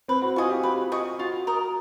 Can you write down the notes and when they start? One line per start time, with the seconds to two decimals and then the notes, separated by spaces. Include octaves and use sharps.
0.08 C4 B4
0.22 F#4
0.36 F4 D#5 G#5 C#6
0.50 G4
0.63 G4 B4
0.92 D#5 G#5 C#6
1.19 F4 F#4
1.47 A#4 D#5